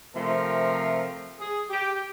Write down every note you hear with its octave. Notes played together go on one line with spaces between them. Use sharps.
C3 F3 A3 A#4
G#4
G4